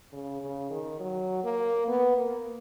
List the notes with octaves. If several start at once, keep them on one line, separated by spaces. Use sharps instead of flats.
C#3
C#3
D#3
F#3
A#3
B3
A#3